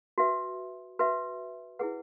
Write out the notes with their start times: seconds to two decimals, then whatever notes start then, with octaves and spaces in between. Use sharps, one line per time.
0.18 F#4 B4 E5
0.99 F#4 B4 E5
1.79 E4 G#4 B4 F#5